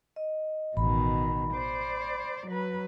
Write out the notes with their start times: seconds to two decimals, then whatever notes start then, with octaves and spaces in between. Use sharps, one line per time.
0.16 D#5
0.77 A1 B2 D#3 B5
1.55 C5 D5
2.47 F#3 B4